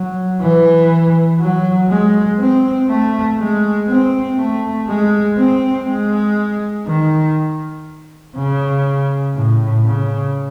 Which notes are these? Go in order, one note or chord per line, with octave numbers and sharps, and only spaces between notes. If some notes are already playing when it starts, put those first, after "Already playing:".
Already playing: F#3
E3
F#3
G#3
C4
A3
G#3
C4
A3
G#3
C4
G#3
D#3
C#3
A2
C#3